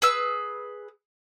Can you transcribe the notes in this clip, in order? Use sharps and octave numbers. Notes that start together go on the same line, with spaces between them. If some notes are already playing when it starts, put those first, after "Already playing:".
G#4 B4 E6